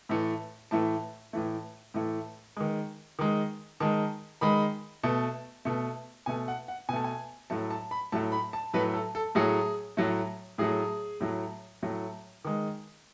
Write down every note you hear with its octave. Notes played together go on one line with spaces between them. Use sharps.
A2 E3 A3
A2 E3 A3 A5
A2 E3 A3
A2 E3 A3
D#3 G#3
D#3 G#3
D#3 G#3 A5
D#3 G#3 B5
B2 A3 A5
B2 A3
B2 A3 G#5
F#5
F#5
B2 A3 G#5 A5
G#5
A2 F#3 A3 A5
A5
B5
A2 F#3 A3 A5
B5
A5
A2 F#3 A3 B4
A4
A4
A2 F#3 A3 G#4
A2 F#3 A3
A2 F#3 A3 G#4
A2 F#3 A3
A2 F#3 A3
D#3 G#3